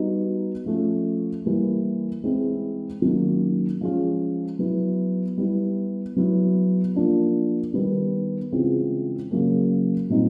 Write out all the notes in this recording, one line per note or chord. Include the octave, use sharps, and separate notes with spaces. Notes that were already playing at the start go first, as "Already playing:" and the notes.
Already playing: G3 B3 D#4 F#4
F3 A3 C#4
E3 G3 A#3
E3 G#3 C4 E4
D#3 F#3 A#3 C#4
F3 G#3 C#4 F4
F#3 B3 E4
G3 B3 E4
F#3 B3 E4
F3 A#3 D4 F4
D#3 G3 B3
C#3 E3 G#3 C4 F4
C#3 F#3 A#3 C#4
A#2 G3 C4 D#4